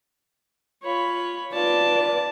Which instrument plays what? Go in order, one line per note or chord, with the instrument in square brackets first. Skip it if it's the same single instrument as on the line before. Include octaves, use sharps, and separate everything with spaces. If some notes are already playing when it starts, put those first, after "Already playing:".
[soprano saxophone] F4 [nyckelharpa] C#5 B5
[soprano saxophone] F4 [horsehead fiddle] B4 D5 [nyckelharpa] A5